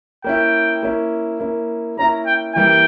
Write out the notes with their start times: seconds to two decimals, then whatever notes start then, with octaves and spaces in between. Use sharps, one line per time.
0.24 A#3 C#4 E4 G5
0.83 A#3 C#4 E4
1.40 A#3 C#4 E4
1.97 A#3 C#4 E4 A#5
2.26 G5
2.55 E3 G3 A#3 E4 G5